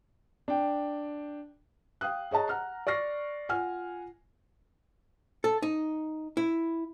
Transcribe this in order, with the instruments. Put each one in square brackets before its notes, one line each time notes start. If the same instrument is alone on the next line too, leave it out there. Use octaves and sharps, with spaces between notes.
[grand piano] D4 G5
[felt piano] F5 G5 D#6 F#6
G#4 C#5 D#5 A5 A#5
F#5 A#5 F6
D5 C#6 F6 A#6 C7
F4 F#5 G#5 F6
[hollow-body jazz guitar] A4
D#4
E4